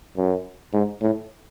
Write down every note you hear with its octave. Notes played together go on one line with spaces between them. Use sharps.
F#2
G#2
A2